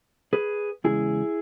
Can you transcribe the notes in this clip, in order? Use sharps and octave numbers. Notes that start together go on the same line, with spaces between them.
G#4 B4
E2 C#3 G#3 E4 G#4